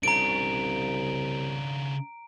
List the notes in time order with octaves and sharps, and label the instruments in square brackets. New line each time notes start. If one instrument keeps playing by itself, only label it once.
[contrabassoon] C2 [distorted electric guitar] C#3 D4 [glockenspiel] A#5 D7